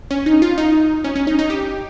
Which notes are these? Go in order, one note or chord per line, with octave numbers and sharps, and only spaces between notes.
C#4
D#4
F4
D#4
C#4
C#4
D#4
D#4
G4